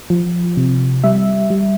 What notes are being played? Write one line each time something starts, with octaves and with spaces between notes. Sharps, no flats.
F3
C3
G3 E5
G3